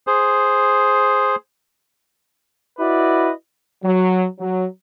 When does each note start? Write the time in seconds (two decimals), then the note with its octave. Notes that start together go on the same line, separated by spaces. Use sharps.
0.07 G#4 C5
2.79 E4 F#4 B4 D5 D#5
3.83 F#3
4.39 F#3